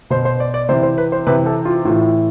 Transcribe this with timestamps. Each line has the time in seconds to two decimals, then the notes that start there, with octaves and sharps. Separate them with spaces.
0.10 B2 C5
0.25 C5
0.40 D5
0.54 D5
0.69 C3 E3 C5
0.83 C5
0.98 B4
1.12 C5
1.27 C3 E3 B4
1.46 A4
1.65 F4
1.85 A2 E3 F4